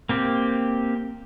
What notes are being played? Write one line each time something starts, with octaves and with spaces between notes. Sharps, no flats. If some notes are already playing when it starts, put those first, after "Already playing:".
A#3 C4 G4